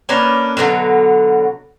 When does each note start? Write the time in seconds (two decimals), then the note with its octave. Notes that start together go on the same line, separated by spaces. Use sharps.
0.09 A#3 C#4 D4 B4
0.57 B2 D3 F3 F#3